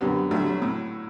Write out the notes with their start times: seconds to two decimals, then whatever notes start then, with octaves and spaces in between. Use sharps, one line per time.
0.01 F#2 D3 G3 B3
0.31 G2 D3 F#3 A3
0.47 F#3
0.62 A2